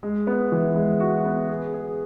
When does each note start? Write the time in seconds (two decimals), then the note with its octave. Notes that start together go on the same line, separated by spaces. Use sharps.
0.03 G#3
0.27 B3
0.52 E3
0.76 G#3
1.00 F#4
1.25 B3
1.49 G#4
1.74 G#4